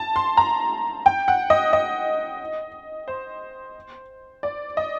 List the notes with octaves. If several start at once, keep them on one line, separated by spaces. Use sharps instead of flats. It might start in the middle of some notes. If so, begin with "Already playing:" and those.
Already playing: A5
C6
A#5
G5
F#5
D#5
D#5
C5
D5
D#5